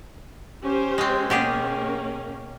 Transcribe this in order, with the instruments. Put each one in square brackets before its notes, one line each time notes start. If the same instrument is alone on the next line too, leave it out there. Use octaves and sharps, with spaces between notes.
[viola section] C#4 G4 C5
[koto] G#3 C4
[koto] B2 G4 G#4 [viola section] A#3 C#4